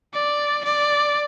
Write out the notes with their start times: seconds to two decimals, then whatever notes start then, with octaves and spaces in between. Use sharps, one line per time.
0.14 D5
0.64 D5